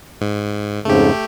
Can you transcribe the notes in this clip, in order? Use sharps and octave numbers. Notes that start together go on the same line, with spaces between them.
G#2
F2 G#2 C#3 A3 G4